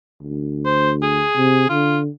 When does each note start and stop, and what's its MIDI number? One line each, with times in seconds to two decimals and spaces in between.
0.21 1.23 38
0.65 0.91 72
1.02 1.66 68
1.37 1.68 48
1.69 2.09 50
1.69 1.98 65